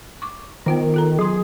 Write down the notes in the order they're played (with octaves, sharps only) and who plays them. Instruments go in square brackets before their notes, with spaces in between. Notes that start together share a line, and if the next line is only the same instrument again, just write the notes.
[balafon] C#6 D6
[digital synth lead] D#3 [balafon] B3 F4 C5
[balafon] F4 A4 A#5
[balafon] F#3 C6 [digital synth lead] G#4